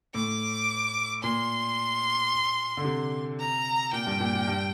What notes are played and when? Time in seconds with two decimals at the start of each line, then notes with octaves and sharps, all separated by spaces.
0.15 A2 D6
1.23 A#2 C6
2.77 D3
2.85 C3
3.39 A#5
3.93 A#2 G5
4.07 G2
4.20 A#2
4.35 A#2
4.48 G2